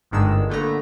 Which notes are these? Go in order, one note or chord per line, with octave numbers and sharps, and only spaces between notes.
G1 G#2 D#3 G#3 D4 E6
A#2 D3 A3 B3 A#5